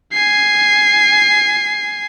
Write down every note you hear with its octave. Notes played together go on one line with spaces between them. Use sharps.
G#5 C7